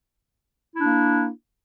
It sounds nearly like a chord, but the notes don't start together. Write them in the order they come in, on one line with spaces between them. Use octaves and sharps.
E4 D4 A#3